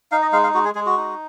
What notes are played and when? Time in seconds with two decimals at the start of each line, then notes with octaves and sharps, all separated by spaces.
0.12 D#4 F5
0.22 D#5
0.32 G#3 F5
0.43 F5
0.54 G#3 F#4
0.65 G#4
0.75 G#3 G#4
0.86 F#4
0.97 D#4